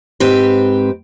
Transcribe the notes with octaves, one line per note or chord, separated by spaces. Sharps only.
G#2 C4 G4 B4